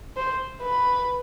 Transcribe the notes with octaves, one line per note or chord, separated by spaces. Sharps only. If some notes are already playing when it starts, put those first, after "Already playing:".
C5
B4